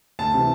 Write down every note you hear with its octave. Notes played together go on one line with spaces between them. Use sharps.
D2 A5
C3 E3